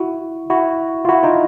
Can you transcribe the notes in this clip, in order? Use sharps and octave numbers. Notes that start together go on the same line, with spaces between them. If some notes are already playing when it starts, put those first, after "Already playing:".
Already playing: E4 F#4
E4 F#4
F4
E4 F#4
D#4 F4